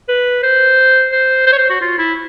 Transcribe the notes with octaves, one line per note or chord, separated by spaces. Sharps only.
B4
C5
C5
C5
C#5
C5
F#4
F4
E4